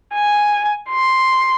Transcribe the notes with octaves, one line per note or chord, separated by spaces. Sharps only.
G#5
C6